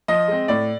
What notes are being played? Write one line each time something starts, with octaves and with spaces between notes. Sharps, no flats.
F3 D#5
G#3 C4
A2 D5